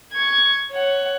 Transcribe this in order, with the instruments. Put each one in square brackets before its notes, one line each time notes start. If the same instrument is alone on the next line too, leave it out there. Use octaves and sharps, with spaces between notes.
[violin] C#6 G#6
C#5 F#5